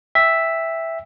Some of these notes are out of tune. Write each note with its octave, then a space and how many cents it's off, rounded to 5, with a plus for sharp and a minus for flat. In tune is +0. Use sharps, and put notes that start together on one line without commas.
E5 +0 G5 +20